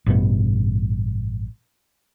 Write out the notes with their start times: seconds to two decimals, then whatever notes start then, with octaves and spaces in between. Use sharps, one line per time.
0.06 A1 G2 B2